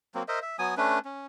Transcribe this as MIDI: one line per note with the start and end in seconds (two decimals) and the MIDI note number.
0.15 0.23 54
0.15 0.23 58
0.15 0.23 60
0.28 0.39 70
0.28 0.39 72
0.28 0.39 75
0.28 0.39 76
0.42 0.57 76
0.59 0.75 54
0.59 0.75 59
0.59 0.75 80
0.59 0.75 87
0.77 0.99 57
0.77 0.99 61
0.77 0.99 62
0.77 0.99 71
1.05 1.26 61